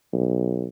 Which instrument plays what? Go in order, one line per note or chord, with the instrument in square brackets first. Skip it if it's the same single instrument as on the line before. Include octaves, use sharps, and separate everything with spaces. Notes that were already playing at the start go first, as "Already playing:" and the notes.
[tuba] B1